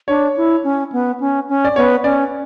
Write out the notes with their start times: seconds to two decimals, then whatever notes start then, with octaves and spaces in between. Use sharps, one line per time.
0.08 D4 C#5
0.37 E4
0.64 C#4
0.92 B3
1.20 C#4
1.48 C#4
1.65 D5
1.76 B3 C#5
2.04 C#4 D5